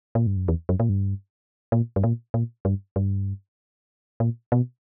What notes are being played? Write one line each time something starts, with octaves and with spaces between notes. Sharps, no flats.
A#2
G2
F#2
E2
F#2
A#2
G2
A#2
G2
A#2
A#2
G2
G2
A#2
B2